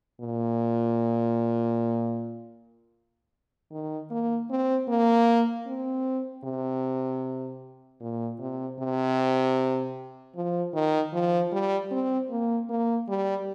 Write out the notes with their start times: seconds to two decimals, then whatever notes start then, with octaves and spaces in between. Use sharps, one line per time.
0.21 A#2
3.72 D#3
4.11 A#3
4.50 C4
4.88 A#3
5.67 C4
6.44 C3
8.01 A#2
8.40 C3
8.80 C3
10.36 F3
10.74 D#3
11.13 F3
11.52 G3
11.91 C4
12.30 A#3
12.69 A#3
13.08 G3